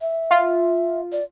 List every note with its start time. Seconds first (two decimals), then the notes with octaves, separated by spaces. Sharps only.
0.01 E5
0.31 F4
1.12 D5